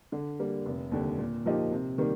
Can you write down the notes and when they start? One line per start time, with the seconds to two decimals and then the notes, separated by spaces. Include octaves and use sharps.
0.12 D3
0.40 G3 A#3
0.66 F1
0.92 D#2 D3 G3
1.18 A#2
1.46 F3 A#3 D#4 G4
1.72 C3
1.98 D#3 G3 A#3